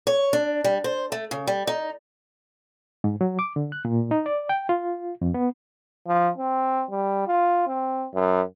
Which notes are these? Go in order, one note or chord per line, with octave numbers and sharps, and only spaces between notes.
C#5
D4
G3
C5
A3
C#3
G3
D#4
G#2
F#3
D6
D3
F#6
A#2
D#4
D5
G5
F4
F2
B3
F3
C4
G3
F4
C4
F#2